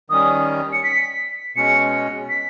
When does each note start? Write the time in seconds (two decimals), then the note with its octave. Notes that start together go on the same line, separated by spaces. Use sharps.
0.10 D#3 G3 C#4 D#6
0.73 C#7
0.84 B6
1.56 B2 G#3 C#4 C#7
2.30 B6